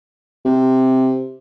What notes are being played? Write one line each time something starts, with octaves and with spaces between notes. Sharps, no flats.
C3